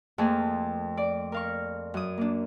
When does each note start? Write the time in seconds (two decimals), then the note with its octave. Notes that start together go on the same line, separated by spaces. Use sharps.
0.18 F2 F3 A3 A#3 G#4
0.97 D5
1.32 A#4 F5 C#6
1.94 F#2 D#6
2.18 A#3 D4